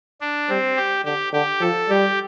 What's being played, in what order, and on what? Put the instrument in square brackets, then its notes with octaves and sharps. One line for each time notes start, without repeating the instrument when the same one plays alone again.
[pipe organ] D4
[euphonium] G3 [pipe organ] C4
[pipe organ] G4
[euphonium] D3 [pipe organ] G4
[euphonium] D3 [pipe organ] G4
[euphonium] F3 [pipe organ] A4
[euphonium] G3 [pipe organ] G4